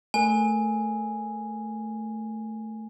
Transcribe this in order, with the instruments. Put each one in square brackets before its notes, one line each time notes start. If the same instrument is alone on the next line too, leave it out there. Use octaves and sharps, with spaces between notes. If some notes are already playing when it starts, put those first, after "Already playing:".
[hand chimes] A3 A#4 [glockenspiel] G#5